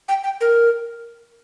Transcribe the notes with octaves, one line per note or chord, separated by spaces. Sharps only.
G5
G5
A#4